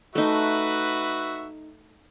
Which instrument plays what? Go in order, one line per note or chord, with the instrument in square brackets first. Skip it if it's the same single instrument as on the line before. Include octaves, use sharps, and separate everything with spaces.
[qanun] A3 D#4 [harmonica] F#4 B4 E5